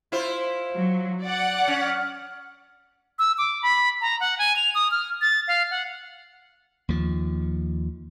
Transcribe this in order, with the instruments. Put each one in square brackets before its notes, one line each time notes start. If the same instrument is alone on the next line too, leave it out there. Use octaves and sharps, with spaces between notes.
[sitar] E4 F4 C5
[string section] F#3
D5 F#5
[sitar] C#4
[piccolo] E6
D6
B5
A#5
F#5
G#5
F7
D#6
F6
A6
F5
F#5
[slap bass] D#2 F3